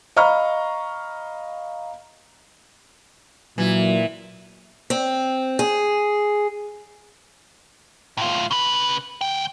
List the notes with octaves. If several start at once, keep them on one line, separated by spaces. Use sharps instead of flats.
D#5 F5 A#5 B5 C#6 F6
A#2 E3 F#3
C4
G#4
A2 F4
C#3 B4
D2 G5